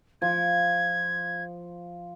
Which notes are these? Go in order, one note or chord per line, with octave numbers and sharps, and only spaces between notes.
F3 G#6